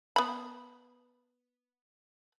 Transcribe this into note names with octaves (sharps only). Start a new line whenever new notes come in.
B3 B5